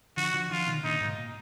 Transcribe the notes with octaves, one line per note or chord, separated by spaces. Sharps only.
D3 F3 F#4
D3 F3
D3 F3 F4
B2 D#3
A#2 D3 D#4
G#2 B2
A#2